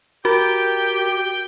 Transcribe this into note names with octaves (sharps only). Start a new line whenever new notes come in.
F#4 G4 A#4 G5